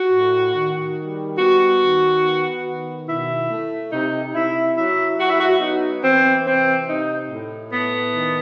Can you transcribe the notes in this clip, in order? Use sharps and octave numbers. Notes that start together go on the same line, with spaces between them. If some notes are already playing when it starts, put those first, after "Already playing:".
Already playing: F#4
A2
D#3
G3
B3 F#4
D#3
B3
D#3
B2 E4
A3
C3 D#4
C3 E4
F#3 E4
F#3 F#4
E4
F#4
B3 D#4
E3 C4
C3 C4
C3 D#4
A2
A3 B3
D#3